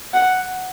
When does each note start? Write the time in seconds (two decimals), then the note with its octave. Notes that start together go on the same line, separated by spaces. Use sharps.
0.14 F#5